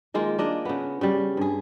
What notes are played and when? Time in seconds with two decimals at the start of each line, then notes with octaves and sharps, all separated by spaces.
0.14 D#3 G#3 A#3 F4
0.38 A#3 D4 D#5
0.65 C#3 B3
1.01 C#3 G3
1.37 G2 G#4